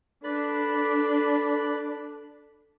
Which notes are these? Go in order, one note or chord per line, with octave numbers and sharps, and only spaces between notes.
D4 A4 B4 D5 B5